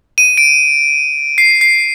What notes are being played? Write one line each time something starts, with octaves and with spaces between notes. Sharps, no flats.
D#7
D7
C7
C7